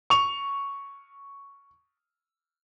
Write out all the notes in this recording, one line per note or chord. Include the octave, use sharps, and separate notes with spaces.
C#6 F7